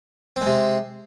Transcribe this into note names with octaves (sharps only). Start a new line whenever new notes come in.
C3 G#3 C4